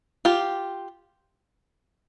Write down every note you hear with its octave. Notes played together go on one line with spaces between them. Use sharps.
F4 G4